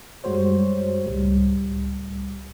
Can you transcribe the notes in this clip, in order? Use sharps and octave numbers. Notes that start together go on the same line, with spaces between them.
F#2 G3 G#3 F#4 C5 C#5
C#2 A2 G3